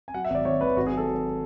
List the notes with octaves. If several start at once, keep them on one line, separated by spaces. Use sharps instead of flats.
G#5
F#3 F#5
E5
G#1 D5
G#1 C#5
G#1 B4
G#1 F#4
G#4
F#3
A4
F#3